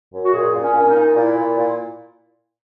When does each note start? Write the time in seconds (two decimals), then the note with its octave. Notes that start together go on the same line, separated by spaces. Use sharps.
0.12 F#2
0.24 F#4
0.33 A#2 G#4
0.54 A#2
0.61 C#4
0.74 A#2
0.82 C#4
0.88 D#4
0.94 A#2
1.15 A#2 E4
1.36 A#2
1.56 A#2